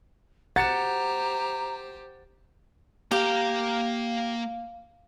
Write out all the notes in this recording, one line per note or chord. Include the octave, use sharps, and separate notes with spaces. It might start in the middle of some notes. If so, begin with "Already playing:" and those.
G4 C5 F#5 A#5 A6 C#7 E7
A#3 G4 F5 A#5